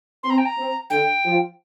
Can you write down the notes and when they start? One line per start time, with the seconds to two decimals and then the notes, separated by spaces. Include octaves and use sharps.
0.23 C4 C6
0.30 A#5
0.38 G5
0.45 A#5
0.57 C4
0.90 D3 G5
1.24 F3